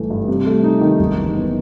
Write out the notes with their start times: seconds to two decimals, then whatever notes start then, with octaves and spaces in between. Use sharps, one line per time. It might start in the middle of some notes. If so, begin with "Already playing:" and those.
Already playing: G1 E3 A3
0.10 G2
0.28 C3
0.46 A3
0.64 D#4
0.81 D#3
0.99 F#1
1.17 E3
1.36 B3